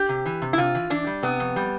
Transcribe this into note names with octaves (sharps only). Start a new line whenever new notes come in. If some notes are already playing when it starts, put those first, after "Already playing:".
Already playing: G4
C3
E3
C3
E4
C3 F4
E3
E3 D4
G3
C3 B3
F2
G3